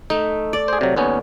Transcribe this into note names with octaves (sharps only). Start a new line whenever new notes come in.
A3 D#4
D5
G#4 C5
C3 F#3
D#2 B3 C#4